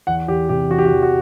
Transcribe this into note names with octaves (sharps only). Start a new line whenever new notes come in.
E2 F#5
E2 G4
C3 G4
E3 F#4
G4
F#4
E2
F#4